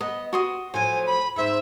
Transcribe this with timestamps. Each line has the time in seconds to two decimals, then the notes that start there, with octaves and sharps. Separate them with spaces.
0.01 B3 B4 D#5
0.33 F#4 C6 D#6
0.74 A2 F3 F#3 C5 G#5
1.06 B5
1.36 G#2 C4 E5